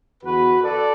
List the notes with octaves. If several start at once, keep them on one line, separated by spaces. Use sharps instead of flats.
E2 D3 F#4 B4
A4 D5